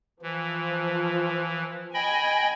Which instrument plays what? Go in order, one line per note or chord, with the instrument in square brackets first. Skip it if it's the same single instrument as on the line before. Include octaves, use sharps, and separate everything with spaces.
[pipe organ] E3 [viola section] F3
[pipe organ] D#5 G5 B5 [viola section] G#5